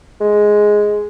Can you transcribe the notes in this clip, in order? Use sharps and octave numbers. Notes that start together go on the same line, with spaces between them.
G#3